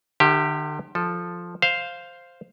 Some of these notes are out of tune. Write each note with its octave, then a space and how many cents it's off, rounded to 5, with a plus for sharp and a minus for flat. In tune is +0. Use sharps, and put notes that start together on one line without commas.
D3 +45 G4 +0 E5 +0
F3 +0 A4 +0
C5 +0 F5 +0